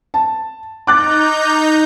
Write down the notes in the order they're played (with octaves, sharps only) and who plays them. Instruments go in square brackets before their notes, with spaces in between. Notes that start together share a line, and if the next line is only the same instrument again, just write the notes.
[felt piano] A5
[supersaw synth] D#4 A#5 G6 [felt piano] D6 F#6 A6